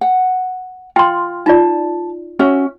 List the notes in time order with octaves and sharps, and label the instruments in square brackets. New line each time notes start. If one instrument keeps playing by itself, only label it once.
[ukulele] F#5
[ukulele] F4 [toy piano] G5 C6
[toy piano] D#4 F4 D5 [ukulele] A5
[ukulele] C#4 F#4 E5